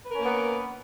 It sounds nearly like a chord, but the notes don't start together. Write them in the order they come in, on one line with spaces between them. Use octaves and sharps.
B4 A#4 C#4 A#3 B3